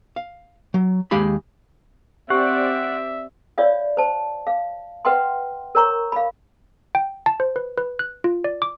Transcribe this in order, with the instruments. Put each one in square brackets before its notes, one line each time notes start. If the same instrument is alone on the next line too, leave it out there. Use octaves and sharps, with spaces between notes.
[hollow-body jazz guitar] F5
F#3
D#2 G#3 G4 F5 B5
[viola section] C4 D5 [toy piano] G4 [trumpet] E5 [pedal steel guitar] F#5
[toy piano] F4 C#5 D5 E5 F5
C5 A5
F5
B4 E5 F#5 G5 C6
A#4 C#5 A#5 C#6
F5 B5
[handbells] G5
A5
C5
B4
B4
F#6
F4
D5
D6